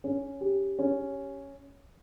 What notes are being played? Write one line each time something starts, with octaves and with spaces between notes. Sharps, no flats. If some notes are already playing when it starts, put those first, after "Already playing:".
C#4
G4
C#4